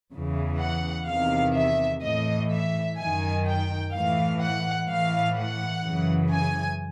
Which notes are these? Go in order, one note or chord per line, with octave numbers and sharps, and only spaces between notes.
E2 C#3 E3
F#5
E2 C3 D#3 F5
E5
A2 E3 D#5
E5
F#2 D#3 G#5
G5
A2 E3 F5
F#5
A2 E3 F5
F#5
F#2 C#3 E3
G#5